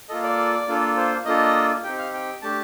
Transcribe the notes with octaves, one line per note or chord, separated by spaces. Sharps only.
A#3 F4 A4 D#5
D5
A#3 D4 F4 A4
C5
A#3 D4 F4 A4 D#5
C4 D#4 G4 G5
F5
G5
A3 D4 G4 A5